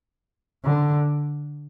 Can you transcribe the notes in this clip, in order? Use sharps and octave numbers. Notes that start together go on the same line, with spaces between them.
D3